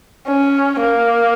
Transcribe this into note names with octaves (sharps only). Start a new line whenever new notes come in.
C#4
A#3